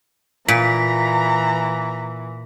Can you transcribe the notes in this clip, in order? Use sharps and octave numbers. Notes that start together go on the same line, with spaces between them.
A#2 E3 A#5 B6